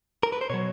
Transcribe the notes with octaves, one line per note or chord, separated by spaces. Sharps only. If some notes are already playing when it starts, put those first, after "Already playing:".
A#4
B4
C5
B2 F#3 C#5